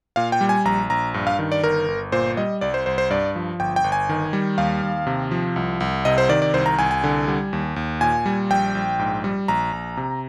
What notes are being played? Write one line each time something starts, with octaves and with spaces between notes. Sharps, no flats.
A#2 F5
G5
G3
G#5
A#1 A#5
A#1 A#5
G2
F5
D#3
D5
G1 A#4
G1
A#2 C5
G3 D#5
C2 D5
C5
C2 C5
C5
G2 D5
F3
G1 G5
G5
G1
G#5
D#3
G3
D#2 F5
D#2
C3
F3
C2
C2
C3 D#5
C5
D#3 D5
D5
C2 C5
A#5
C2 G#5
G#5
D3
G3
D#2
D#2
A#2 G#5
G3
A#1 G5
A#1
G#2
G3
A#1 A#5
A#1
C3